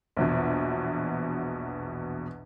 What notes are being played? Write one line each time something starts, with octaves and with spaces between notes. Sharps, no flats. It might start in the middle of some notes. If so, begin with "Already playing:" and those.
A#1 E2 B2